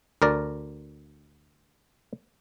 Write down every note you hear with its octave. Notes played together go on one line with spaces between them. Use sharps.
D2 A#4 D5